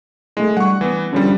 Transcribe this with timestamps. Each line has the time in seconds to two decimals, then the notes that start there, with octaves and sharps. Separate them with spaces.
0.37 G#3 A3 E4
0.57 G3 F#5 C#6
0.81 E3 B3
1.13 D3 F3 G3 C#4